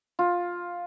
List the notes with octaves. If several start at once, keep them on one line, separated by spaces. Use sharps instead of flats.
F4